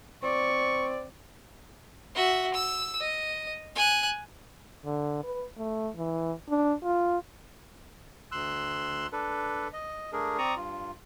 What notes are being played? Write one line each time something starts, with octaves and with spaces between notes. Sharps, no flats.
C4 D5 C#6
F#4 E5
E6
D#5
G#5 F#6
D3
B4
A3
E3
D4
F4
D2 C6 E6 F#6
D4 A4 B4
D#5
A3 D4 G#4 A#4
C4 D5 A#5 C#6 D#6
G2 F4